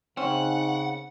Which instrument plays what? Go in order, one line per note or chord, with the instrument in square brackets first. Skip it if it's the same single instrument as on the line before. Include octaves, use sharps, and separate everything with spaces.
[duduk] C#3 [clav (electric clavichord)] C4 C#4 [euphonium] D#4 [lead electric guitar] F#5